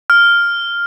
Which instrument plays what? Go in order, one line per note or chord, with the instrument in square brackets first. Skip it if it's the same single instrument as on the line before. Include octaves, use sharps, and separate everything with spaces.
[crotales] F6